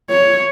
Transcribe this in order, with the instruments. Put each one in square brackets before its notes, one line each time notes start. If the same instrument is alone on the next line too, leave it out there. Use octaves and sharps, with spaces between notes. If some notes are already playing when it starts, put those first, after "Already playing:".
[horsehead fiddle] C#5